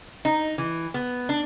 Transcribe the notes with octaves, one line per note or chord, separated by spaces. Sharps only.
D#4
E3
B3
D4